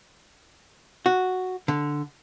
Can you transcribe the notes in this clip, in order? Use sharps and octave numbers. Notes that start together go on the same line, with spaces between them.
F#4
D3